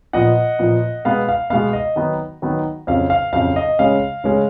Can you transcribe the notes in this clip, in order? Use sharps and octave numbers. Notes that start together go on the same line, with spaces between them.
A#2 F3 B3 D#5 F#5
A#2 F3 B3
B2 G#3 B3 F5
F5
B2 G#3 B3 F5
D#5
D#3 F#3 B3 D#4
D#3 F#3 B3 D#4
F2 C#3 F#3 F5
F5
F2 C#3 F#3 F5
D#5
C#3 G#3 C#4 F5
C#3 G#3 C#4